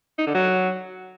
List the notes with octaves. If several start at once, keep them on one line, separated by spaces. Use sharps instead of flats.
D#4
D3
F#3